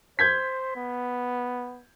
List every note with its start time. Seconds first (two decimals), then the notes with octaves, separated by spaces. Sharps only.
0.19 C5 G6 G#6 B6
0.75 B3